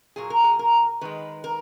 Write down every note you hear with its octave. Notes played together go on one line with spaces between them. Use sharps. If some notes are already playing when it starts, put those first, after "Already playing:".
A#2 F#3 A#3 G#4
A#4
G#4
A#4
D#3 G#3 B4
A#4